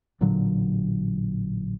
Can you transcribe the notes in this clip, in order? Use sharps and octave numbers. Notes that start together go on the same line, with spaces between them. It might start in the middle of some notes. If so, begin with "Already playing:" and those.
A1 A#2 D3 F#3